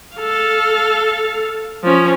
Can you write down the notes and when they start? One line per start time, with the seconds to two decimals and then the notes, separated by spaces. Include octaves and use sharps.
0.17 A4 F5
1.84 F3 C#4